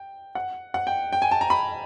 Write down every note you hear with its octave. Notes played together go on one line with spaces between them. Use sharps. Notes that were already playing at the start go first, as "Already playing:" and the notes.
Already playing: G5
F#5
F#5
G5
G5
G#5
A5
A#5
B5